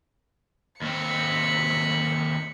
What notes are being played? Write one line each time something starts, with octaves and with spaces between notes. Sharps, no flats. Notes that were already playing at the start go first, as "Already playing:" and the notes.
D#2 C4 B5 C#7